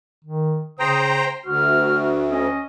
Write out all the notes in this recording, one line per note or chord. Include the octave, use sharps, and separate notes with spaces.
D#3
C#3 C5 G5 A#5 D#6
C6
D2 F#4 F6
C#4 D#5